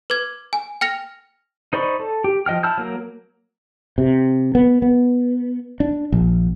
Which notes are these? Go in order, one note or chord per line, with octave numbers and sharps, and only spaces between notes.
B4 D6 G#6
G#5
G5 F6 A#6 F7
D#4 C5 D5 B5 C#6
A4
G4
F3 D#5 G5 F6
E4 A5 E6 F6 G6
F#3 A#3 A#4
C3
B3
B3
D4
A#1